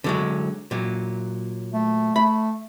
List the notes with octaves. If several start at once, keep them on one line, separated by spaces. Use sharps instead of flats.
D3 F#3 G#3
A#2 F#3
A3
A3 B5